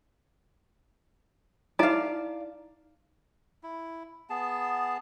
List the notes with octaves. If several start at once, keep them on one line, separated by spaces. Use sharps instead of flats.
D#4 E4 D5 F5 A#5
E4
B3 G#4 A5